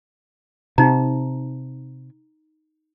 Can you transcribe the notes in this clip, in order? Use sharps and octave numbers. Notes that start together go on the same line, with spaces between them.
C3 D#4 A#5